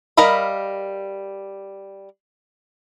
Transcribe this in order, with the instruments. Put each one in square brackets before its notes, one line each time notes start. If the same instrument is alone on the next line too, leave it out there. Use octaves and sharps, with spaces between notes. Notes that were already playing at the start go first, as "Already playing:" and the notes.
[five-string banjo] G3 A#4 D#5 F5 B5